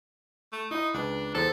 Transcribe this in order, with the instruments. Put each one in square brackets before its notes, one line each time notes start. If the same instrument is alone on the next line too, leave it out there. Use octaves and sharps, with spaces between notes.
[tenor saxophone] A3
[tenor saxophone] D#4 [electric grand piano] E4 D#5
[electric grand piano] C#2 B4 [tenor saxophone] D4
[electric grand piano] E2 C5 [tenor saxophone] A4